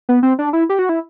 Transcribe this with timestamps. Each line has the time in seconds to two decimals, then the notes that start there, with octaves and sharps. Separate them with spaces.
0.09 B3
0.23 C4
0.39 D4
0.53 E4
0.69 G4
0.79 F#4
0.89 E4